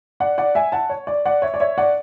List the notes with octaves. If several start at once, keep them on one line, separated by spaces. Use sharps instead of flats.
D5 F#5
D5 F#5
E5 G#5
F#5 A5
C#5
D5
D5 F#5
C#5 E5
D5
C#5 E5
D5 F#5